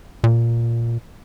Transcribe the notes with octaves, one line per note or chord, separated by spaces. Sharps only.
A#2